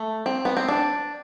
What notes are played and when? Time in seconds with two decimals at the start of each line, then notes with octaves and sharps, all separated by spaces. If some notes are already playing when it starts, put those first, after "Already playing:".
Already playing: A3
0.26 C4
0.45 B3
0.57 C4
0.68 D4